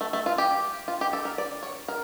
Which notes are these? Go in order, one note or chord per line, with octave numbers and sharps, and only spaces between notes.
A3
A3
F4
G4
F4
G4
A4
A#4
D5
C#5
A#4